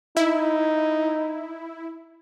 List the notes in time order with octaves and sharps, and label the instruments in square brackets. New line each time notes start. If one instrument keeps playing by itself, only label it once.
[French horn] D#4 [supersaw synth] E4